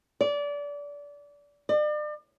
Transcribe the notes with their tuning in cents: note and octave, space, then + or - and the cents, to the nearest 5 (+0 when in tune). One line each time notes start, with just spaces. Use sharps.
D5 -25
D5 +40